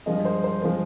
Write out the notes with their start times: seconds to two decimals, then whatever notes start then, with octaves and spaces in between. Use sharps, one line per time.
0.06 G2 F3 G#3 D#5
0.25 C5
0.44 C5
0.62 F3 G#3 C5